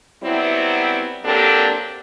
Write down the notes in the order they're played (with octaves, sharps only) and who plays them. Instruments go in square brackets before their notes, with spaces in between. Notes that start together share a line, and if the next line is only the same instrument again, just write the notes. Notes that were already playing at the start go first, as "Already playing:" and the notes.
[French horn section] F#3 G3 B3 C4 E4
F#3 A#3 C4 D4 G4 A4